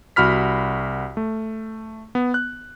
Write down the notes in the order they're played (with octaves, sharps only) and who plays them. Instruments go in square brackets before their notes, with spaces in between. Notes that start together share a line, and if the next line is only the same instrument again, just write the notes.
[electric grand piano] C2 F#4 B5 F6 B6
A3
B3
F#6